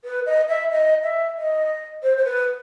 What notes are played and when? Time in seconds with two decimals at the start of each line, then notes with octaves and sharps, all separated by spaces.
0.05 B4
0.26 D#5
0.48 E5
0.71 D#5
1.03 E5
1.38 D#5
2.03 C5
2.17 C5
2.25 B4